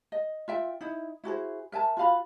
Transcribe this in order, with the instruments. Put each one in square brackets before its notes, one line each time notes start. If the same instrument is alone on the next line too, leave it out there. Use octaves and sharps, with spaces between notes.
[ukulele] D#5
F4 E5 G5
D#4 E4
E4 F#4 G#4 C5
A#4 E5 G#5 A5
F4 F#4 F5 B5